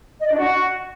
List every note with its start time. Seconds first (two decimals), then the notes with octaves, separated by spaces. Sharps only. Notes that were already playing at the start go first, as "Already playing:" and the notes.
0.20 D#5
0.26 D5
0.32 D4
0.38 F#4